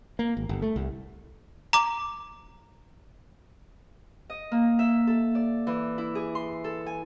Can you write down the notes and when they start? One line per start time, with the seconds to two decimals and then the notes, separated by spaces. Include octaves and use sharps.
0.19 A#3
0.37 G#1
0.49 G1
0.62 A3
0.76 C2
1.73 A#5 D6
4.30 D#5
4.52 A#3
4.79 E5
5.07 A4
5.35 D5
5.67 E3
5.98 E4
6.15 G#4
6.35 C6
6.64 A4
6.86 G#5